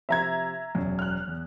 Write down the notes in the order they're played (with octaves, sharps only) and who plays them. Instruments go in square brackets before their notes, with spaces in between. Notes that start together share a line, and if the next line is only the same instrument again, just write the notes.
[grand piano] C3 F3 [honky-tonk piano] E5 A#5 G#6
[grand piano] E1 F#2
[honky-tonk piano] F6 F#6
[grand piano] E2